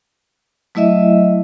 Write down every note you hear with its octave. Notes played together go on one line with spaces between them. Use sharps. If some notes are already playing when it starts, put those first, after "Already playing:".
F#3 A3 E4 D#5 E5